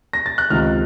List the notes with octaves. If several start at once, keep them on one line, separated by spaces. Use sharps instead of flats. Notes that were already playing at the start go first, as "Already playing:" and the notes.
A#6
A6
F#6
C#2 C3 D#3 F6